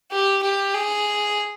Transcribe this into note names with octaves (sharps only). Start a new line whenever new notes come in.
G4
G4
G#4